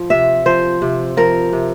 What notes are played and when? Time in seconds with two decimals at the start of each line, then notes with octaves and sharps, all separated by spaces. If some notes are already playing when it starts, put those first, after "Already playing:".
Already playing: F3
0.10 C3 E5
0.46 F3 C5
0.82 C3
1.17 F3 A#4
1.53 C3